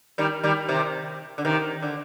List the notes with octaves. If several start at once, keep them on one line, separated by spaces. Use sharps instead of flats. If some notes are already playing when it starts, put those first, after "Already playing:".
D#3 G3
D#3 G3
C3 D#3
D3
C3 D#3
D3